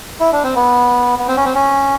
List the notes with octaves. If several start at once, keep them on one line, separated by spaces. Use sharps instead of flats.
E4
D4
C4
B3
B3
C4
C#4
C4
C#4